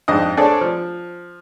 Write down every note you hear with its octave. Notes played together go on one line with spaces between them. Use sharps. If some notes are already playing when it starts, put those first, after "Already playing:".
F2 G#2 D4 D#5 D#6
C4 D4 G#4 A4 C#5 D5
F3